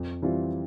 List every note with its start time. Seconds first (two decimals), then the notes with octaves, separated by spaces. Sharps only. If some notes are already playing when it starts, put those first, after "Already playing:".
Already playing: F2
0.22 E3 G3 C4 F4